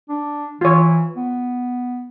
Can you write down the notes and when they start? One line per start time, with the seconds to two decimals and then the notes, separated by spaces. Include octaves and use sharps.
0.09 D4
0.61 E3 F4 C#5
1.16 B3